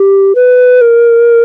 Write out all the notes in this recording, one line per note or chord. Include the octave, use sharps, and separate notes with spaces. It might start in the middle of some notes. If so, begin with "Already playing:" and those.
Already playing: G4
B4
A#4